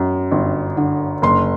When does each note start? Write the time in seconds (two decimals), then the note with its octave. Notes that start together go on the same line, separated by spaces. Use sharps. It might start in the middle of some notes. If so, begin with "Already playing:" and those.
Already playing: F#2
0.31 G1
0.77 D3
1.22 F#1 C6